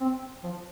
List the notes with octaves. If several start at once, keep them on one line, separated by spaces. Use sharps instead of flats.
C4
F3